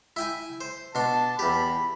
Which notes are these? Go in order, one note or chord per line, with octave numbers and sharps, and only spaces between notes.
E4 G5 G#5
C5
B2 D4 A5 C6
E2 G4 B5